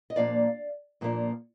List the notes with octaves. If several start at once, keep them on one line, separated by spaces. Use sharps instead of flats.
D#5
A#2 F3 A#3 D4 D5 F5
A#2 F3 A#3 D4